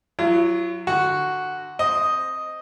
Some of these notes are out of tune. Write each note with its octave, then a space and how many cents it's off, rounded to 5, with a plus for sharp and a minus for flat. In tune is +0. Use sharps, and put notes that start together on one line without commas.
F#3 +0 F4 -45
D3 +15 F#4 +0
C4 +5 D#5 +0